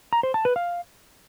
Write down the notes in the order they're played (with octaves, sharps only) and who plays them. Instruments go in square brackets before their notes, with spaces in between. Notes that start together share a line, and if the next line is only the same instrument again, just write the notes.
[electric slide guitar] A#5
C5
A5
B4
F5